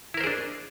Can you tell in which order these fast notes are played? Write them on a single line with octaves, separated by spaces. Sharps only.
E4 A#4 C5 G#4 D4